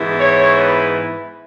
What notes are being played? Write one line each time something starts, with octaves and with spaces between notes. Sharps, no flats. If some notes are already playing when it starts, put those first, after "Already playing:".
Already playing: G#2 E3 B3 E4
C#5
B4